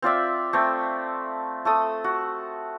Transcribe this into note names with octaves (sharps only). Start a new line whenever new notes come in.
C4 F4 D5 E5
A3 C4
A3 A4 D#6
F#4